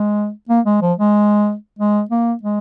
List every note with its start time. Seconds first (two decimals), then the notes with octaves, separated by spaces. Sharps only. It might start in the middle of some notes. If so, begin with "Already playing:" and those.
Already playing: G#3
0.49 A#3
0.66 G#3
0.82 F3
0.98 G#3
1.79 G#3
2.11 A#3
2.43 G#3